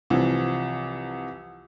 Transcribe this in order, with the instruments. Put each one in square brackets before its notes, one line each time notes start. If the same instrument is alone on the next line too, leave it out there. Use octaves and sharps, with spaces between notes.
[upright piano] C2 E3 F3